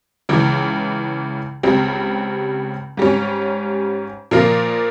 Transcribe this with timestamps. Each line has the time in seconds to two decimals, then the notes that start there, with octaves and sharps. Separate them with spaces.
0.29 C#2 C#3 E3
1.63 C#2 C#3 G3 C4
2.97 G#2 G3 C#4
4.31 A#2 F3 A#3 F4 A#4